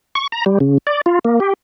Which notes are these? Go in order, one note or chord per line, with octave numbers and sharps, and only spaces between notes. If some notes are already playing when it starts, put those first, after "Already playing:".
C#6
A#5
G3
C#3
D5
F4
A#3
G4